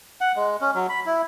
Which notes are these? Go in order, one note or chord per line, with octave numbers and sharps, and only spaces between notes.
F#5
G#3
C#4
F#3
B5
E4